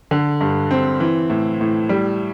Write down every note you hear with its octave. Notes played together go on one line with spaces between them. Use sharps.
D3
G2
C4
E3
A2
A2
G3